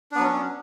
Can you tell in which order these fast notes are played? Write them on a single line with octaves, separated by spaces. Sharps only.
D4 B3 F#3 C#4